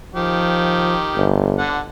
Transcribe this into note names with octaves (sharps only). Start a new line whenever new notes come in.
D#3 F3 G4
G1
D3 F#5